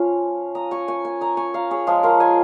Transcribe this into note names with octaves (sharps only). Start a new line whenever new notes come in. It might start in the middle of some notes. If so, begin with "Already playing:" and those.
Already playing: F3 C#4 F4 F5
A#5 D#6
G#5 C#6
G#5 C#6
G#5 C#6
A#5 D#6
G#5 C#6
F5 A#5
G#4 C#5
F3 G#3 F4 G#4
F4 A#4
D#5 G#5